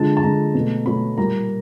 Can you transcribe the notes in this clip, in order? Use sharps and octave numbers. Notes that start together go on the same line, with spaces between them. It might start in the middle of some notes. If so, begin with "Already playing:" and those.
Already playing: D3 F3 G#3 A5
A5
D3 F3 G#3 A#5
B2 F#3 A3
B2 F#3 A3 B5
A#2 G3 A#3 A#5